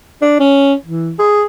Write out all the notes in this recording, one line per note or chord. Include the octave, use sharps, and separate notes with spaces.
D4
C#4
E3
G#4